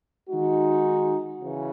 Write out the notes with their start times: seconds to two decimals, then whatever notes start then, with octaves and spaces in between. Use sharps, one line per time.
0.28 D#3 G#3 D#4 F#4
1.40 C#3 E3